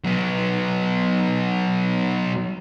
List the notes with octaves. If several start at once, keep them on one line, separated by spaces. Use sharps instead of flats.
F#3 B3